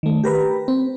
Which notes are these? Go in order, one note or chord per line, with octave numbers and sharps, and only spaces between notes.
D#3 A3
G4 A#4 B4
C4